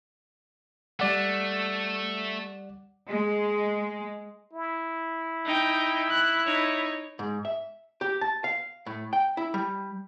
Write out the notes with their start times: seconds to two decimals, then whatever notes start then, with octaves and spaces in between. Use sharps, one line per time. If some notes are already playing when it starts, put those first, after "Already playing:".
1.00 G3 A3 D5 F#5
3.09 G#3
4.53 E4
5.46 D#4 G5
6.10 F#6
6.46 D#4 C#5
7.19 G#2
7.45 E5
8.01 G4
8.21 A5
8.44 F5
8.86 A2
9.13 G5
9.37 E4
9.54 G3